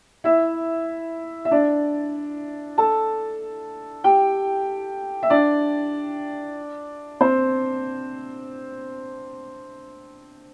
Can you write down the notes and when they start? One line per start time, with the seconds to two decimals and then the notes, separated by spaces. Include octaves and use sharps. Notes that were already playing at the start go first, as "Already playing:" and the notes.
0.24 E4 E5
1.45 E5
1.51 D4 D5
2.78 A4 A5
4.04 G4 G5
5.23 E5
5.30 D4 D5
7.21 C4 C5